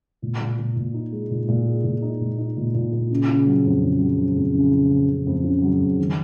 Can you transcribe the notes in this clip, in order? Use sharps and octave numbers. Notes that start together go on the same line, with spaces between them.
A#2
A#2
A#2
A#2
D#4
G#3
A#2
A#2
G#3
A#2
D#4
A#2
D#4
A#2
A#2
A#2
C#3
C#3
F#3
F2
C#3
F#3
C#3
F2
C#3
C#3
C#3
C#3
F2
C#3
F#3
F2
D#3